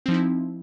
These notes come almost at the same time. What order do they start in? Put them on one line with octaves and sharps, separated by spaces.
C4 F3 D#4 E4